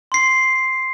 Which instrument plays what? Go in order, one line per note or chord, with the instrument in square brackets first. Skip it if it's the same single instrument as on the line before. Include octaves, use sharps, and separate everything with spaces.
[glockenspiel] C6 C7